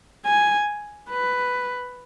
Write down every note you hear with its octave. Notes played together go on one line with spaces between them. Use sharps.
G#5
B4